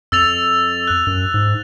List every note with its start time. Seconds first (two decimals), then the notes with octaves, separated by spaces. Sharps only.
0.12 F2 E6 A6 F7
0.87 F#6
1.07 F#2
1.34 G#2